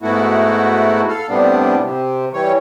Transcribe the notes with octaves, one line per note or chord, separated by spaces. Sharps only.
G#2 A3 B3 E4 F#4
A4 F5
A2 C3 G3 B3 D4
C3
E3 G3 C#5